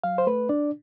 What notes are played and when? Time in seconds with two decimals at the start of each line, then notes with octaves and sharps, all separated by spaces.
0.04 F#3 F5
0.18 C5
0.27 A3 B4
0.49 D4 D5